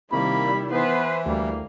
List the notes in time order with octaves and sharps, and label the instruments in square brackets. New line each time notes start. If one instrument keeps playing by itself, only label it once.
[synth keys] C3 D#3 [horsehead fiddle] G3 E4 [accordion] A#3 [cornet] B5
[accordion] E3 [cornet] B3 [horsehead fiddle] B4 C5
[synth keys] D2 [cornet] G3 [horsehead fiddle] A#3